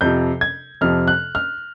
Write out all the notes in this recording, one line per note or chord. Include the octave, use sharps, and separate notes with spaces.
F2 C3 F3 G6
G#6
F2 C3 F3 F6
F#6
F6